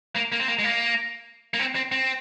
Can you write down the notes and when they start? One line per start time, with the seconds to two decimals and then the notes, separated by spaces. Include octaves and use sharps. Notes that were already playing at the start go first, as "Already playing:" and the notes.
0.16 A#3
0.32 A#3
0.40 C4
0.48 A#3
0.59 G#3
0.64 A#3
1.54 A#3
1.59 C4
1.75 C4
1.92 C4